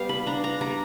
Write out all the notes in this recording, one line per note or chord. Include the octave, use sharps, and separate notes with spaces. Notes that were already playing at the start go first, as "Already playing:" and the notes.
Already playing: G3 B3 F5
B5
D4 A#5
A#5
G3 A#5